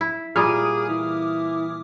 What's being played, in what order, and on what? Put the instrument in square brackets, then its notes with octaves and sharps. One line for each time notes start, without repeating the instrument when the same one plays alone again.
[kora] E4
[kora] A#2 G3 A#4 [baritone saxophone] G#4 [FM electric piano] D6 D#6 F6
[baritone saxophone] E3